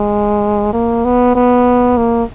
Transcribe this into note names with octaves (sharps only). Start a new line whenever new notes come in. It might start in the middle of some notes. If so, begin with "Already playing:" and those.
Already playing: G#3
A#3
B3
B3
A#3